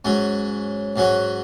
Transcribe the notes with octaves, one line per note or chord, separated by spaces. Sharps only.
G#2 F#3 C#4
G#2 F#3 C#4 F#4